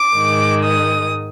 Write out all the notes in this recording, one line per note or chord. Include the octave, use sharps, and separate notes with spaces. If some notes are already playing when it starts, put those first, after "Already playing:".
Already playing: D6
G#2 D#3 G#3
D#6